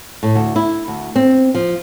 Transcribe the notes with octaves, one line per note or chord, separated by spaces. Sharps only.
A2
D2
E4
D2
C4
F3